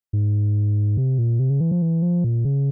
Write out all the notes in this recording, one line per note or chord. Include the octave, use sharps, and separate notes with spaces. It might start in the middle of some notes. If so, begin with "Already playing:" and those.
G#2
C3
A#2
C3
C#3
E3
F3
E3
F3
A#2
C#3